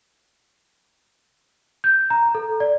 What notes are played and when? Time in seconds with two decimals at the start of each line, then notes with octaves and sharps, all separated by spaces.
1.84 G6
2.10 A#5
2.35 A4
2.60 D5